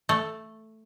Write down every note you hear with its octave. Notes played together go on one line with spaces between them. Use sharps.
A3